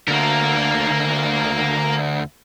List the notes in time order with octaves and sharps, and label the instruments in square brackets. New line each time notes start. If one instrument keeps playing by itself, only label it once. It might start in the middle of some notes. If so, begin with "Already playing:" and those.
[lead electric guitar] D2 D3 [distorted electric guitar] A#3 A#4